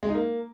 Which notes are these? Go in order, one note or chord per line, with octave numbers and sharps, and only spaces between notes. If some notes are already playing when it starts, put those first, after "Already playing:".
G#3
D#4
A#3